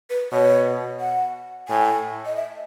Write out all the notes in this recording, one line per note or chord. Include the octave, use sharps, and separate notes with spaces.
B4
B2 C#5
F#5
A2 G#5
D#5
E5